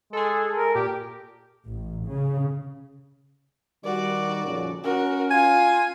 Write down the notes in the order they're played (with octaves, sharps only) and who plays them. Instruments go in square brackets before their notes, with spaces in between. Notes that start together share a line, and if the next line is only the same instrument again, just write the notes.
[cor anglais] G#3 [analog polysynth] G#4 A4
[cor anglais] A#4
[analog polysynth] A#2 [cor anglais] G4
[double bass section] A1
C#3
[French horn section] D#3 G3 A#4 [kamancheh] F#4 D5
[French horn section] F2 A#2 C#3
[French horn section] C#4 [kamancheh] F#4 A#4
[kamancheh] F4 [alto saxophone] G#5